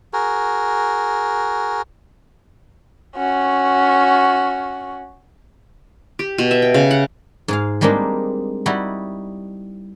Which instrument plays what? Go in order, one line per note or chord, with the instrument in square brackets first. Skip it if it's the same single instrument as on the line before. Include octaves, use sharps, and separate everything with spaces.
[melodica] F#4 G#4 A#4
[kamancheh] C#4 F#4
[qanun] G4
B2
E5
G5
C#3
F#5
[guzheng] G#2 G#4 F5
G3 G#3 A#3 C4 D4 D#4
G3 D#4 E4 F#4